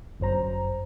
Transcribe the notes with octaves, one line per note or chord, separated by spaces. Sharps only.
G1 F#2 C5 A#5